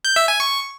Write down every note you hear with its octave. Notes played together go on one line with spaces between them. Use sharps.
G6
E5
G#5
C#6